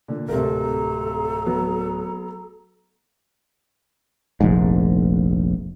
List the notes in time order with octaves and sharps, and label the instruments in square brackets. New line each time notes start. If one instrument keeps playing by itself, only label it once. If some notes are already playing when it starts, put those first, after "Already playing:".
[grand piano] A#2 D3
[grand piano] D1 G#1 [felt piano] C3 A#4 [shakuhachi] A4
[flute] A#5
[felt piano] F#3 B3
[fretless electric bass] F1 A#1 G#2